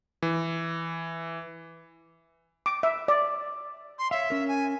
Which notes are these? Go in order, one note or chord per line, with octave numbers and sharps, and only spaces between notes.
E3
D6
E5
D5
C6
C#5 E5 F5
C#4 A#4
G#5